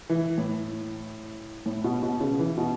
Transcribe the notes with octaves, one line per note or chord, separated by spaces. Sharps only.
E3
A2
A2
B2
B2
C#3
E3
B2